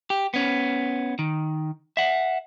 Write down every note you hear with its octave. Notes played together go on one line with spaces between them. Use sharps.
G4
B3 C#4
D#3
E5 F#5